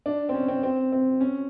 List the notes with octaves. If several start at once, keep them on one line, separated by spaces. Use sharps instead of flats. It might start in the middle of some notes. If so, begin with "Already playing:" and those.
D4
C4
C#4
C4
C4
C4
C#4